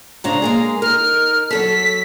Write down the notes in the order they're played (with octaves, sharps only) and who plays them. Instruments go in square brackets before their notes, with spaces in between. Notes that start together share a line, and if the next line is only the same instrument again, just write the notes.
[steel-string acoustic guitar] G#2 C#3 D4 [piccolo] A#5
[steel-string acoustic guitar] G#3 A#3 G#4
[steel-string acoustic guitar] D#4 A#4 [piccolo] F6
[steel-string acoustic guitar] F#3 A4 A5 [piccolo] B6